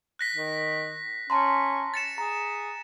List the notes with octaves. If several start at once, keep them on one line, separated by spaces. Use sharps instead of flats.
F#6 A#6 B6
D#3
C#4 A5 A#5 C6
A6 C#7 E7
G#4 A#5